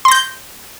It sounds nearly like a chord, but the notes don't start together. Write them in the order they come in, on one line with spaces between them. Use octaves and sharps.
C6 A#6 G6